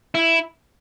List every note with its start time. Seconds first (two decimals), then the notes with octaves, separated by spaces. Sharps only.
0.15 E4